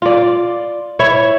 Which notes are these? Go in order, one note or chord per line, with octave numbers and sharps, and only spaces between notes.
F4 D5
E4 C#5